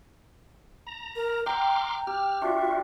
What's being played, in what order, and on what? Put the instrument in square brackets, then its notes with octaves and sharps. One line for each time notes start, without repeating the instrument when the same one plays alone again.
[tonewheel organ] A#5
[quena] A#4
[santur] F#5 G5 [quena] A#5 [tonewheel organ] C6 D6 F6
[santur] G4 [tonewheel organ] F6
[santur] D4 [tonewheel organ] F4 F#4 [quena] E5